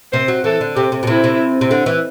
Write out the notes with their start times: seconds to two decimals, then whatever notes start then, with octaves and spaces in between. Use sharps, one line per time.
0.12 C3 C5
0.28 F#3
0.44 E3 A4
0.61 D3
0.76 C3 G4
0.92 C3
1.03 B2
1.07 C3 E4
1.24 C3
1.61 C3
1.71 D3
1.86 E3